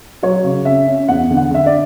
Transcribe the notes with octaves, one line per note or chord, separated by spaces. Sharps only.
F#3 C#5
C#3
C#4 E5
C#4
E2 F#5
D3
F#5
D3 E5
D5